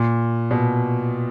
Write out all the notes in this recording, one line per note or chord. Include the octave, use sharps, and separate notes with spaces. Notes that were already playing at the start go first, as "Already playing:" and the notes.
Already playing: A#2
B2